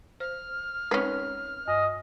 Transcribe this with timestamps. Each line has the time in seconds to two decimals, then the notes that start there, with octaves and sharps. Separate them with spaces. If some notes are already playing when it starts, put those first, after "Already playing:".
0.20 C5 F6
0.91 G#3 C4 C#4 D#4 B4
1.68 G2 D#5